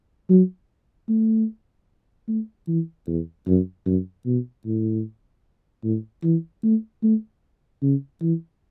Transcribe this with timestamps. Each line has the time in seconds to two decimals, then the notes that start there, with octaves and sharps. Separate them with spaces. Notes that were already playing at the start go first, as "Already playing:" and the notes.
0.30 F#3
1.09 A3
2.28 A3
2.68 E3
3.07 E2
3.47 F#2
3.86 F#2
4.26 B2
4.66 A2
5.84 A2
6.24 E3
6.63 A3
7.03 A3
7.82 C#3
8.22 E3